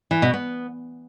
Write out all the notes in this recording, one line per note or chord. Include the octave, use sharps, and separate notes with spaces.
E3
B2
B3